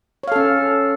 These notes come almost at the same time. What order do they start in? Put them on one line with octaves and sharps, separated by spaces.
C#5 F5 A4 C#4